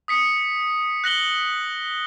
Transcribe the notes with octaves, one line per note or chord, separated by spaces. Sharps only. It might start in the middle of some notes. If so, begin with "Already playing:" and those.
D#6 B6 C#7
F#6 A#6 F#7 G7